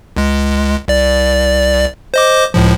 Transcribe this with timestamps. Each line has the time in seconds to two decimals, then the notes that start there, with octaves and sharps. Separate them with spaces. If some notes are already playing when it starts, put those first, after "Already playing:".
0.16 C#2 G#3
0.88 C2 D5
2.14 C5 D#5 D6
2.54 C#2 A2 F3